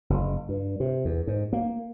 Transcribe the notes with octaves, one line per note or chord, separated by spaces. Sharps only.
F#1
G2
C3
E2
G#2
A#3